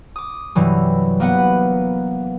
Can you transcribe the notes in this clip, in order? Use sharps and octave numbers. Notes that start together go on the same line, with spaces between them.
D6 D#6
G2 C3 E3 F#3
A#3 B3 B4 F#5